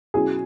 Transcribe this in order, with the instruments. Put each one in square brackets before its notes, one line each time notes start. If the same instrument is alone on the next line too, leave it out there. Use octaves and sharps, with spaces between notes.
[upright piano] B2 F#3 C#4 E4 G#4